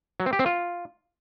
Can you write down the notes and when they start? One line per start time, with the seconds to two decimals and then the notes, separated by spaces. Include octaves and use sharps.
0.20 F#3
0.26 C4
0.33 G4
0.39 C4
0.46 F4